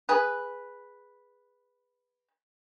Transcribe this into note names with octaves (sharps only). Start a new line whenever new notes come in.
G#4 B4